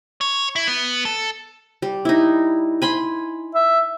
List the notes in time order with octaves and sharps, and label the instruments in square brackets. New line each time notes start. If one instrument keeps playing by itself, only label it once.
[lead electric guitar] C#5
E4
B3
A4
[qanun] G3
D#4 E4
G#5 B5 C6
[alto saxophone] E5